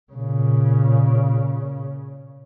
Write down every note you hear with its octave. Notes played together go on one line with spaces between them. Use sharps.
A#2 C#3